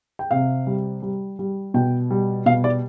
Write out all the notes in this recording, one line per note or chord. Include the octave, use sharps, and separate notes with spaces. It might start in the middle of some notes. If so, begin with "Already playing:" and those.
G5
C3 F5
G3
G3
G3
B2 G5
G3
B2 F5
D5